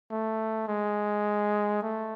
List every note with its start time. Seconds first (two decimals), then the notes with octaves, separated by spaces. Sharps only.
0.11 A3
0.68 G#3
1.82 A3